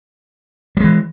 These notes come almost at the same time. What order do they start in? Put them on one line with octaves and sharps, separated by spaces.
G3 G#3 E3